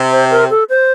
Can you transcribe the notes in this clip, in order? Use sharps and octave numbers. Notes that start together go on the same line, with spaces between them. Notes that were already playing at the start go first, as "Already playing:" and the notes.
Already playing: C3 C4
C5
A#4
A4
C5